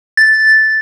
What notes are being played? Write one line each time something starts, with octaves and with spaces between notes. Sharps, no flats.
A6